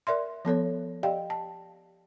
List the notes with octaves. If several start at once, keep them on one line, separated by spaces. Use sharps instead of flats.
A#4 D5 E5 C6
F3 B3 A4 C#5
G4 D5 D#5 F5 G5
A5